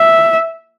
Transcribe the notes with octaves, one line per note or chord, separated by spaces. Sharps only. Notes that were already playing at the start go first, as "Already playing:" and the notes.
Already playing: E5